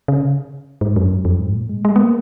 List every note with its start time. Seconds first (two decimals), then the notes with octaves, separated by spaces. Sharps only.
0.08 C#3
0.81 G#2
0.96 F#2
1.25 F2
1.33 F#2
1.40 G#2
1.55 A#2
1.69 G#3
1.85 G#3
1.96 B3
1.99 A#3